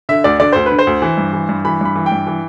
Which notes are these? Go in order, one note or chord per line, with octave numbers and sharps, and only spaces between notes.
D3 E5
D2 D5
D3 D5
D2 C5
B4
D3
C5
D2
E3
G2
E3
G2
E3 B5
G2 B5
E3
G5
G2
E3